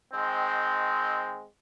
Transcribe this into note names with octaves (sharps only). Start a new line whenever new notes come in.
D#3 G#3 C4